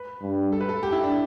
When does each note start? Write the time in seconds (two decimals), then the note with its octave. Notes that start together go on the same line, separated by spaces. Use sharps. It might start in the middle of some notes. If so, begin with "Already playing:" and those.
Already playing: B4
0.22 G2
0.52 A4
0.61 B4
0.69 A4
0.83 G4
0.92 E4
1.04 D4